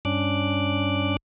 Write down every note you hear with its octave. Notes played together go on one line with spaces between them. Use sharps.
G2 C#4 D4 D6 F#6